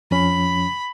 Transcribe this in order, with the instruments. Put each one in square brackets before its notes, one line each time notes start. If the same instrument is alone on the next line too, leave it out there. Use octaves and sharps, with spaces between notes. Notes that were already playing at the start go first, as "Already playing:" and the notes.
[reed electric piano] F2 F3 C#4 [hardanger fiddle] B5